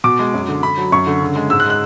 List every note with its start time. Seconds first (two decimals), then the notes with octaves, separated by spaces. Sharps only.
0.04 B2 D6
0.19 G#3
0.34 F#2
0.48 D3
0.62 D3 B5
0.78 F#3
0.92 F#2 C#6
1.06 D3
1.22 C#3
1.36 G#3
1.50 G#2 E6
1.60 F#6
1.65 G#3
1.70 F#6